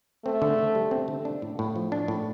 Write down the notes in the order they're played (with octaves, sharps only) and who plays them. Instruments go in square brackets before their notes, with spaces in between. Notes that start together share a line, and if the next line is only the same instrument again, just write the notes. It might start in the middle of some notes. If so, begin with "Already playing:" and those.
[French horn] A3 [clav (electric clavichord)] C4
[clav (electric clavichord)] D3
D3
G3
C4
D3
D4
A2
A2
F3
D4
A2